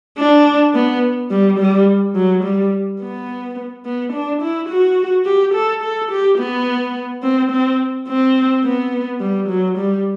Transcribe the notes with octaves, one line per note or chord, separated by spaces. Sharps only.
D4
B3
G3
G3
F#3
G3
B3
B3
D4
E4
F#4
G4
A4
A4
G4
B3
C4
C4
C4
B3
G3
F#3
G3